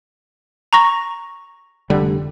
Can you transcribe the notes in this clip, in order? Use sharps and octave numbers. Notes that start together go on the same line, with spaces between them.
A#5 C#6 A#6
F1 D3 G3